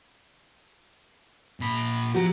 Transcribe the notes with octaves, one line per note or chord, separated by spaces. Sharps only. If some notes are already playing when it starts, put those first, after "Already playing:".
A#2 B5
F3 F#4 G4 A#5